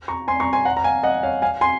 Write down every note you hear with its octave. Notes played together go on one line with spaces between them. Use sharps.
A#5 C#6
G#5 C6
A#5 C#6
G#5 C6
F#5 A#5
A#5
F5 G#5
D#5 F#5
C#5 F5
F5 G#5
G#5 C6